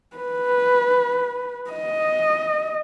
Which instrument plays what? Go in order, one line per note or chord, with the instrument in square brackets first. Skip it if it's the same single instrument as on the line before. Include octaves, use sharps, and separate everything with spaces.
[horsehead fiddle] B4
D#5